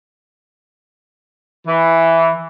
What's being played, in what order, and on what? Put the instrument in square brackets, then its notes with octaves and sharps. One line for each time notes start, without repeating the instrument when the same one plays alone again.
[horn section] E3